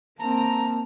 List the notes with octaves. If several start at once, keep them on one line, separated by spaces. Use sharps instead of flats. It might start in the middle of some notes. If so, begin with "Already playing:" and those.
A#3 C4 A5 A#5